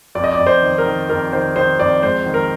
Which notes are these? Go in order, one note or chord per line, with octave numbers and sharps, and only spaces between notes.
F2 D5
D#5
D5
F2
C5
D#3
A#4
D#3
F2 A#4
D#3 C5
D#3 C5
F2 D5
G#2 C5
D#3
A#4